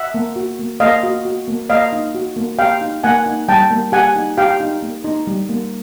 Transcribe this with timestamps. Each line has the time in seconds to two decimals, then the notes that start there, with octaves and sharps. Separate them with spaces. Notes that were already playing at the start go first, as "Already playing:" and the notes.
Already playing: E5 F#5
0.14 A#3
0.36 F#4
0.59 A#3
0.80 A#3 D#5 F5
1.03 F#4
1.25 F#4
1.48 A#3
1.69 A#3 D#5 F5
1.93 D#4
2.15 F#4
2.36 A#3
2.59 G4 F5 G5
2.81 D#4
3.04 A#3 F#5 G#5
3.26 D#4
3.48 G3 G5 A5
3.71 A#3
3.92 G4 F#5 G#5
4.16 D#4
4.38 G4 F5 G5
4.60 D#4
4.82 A#3
5.04 D#4
5.27 G3
5.49 A#3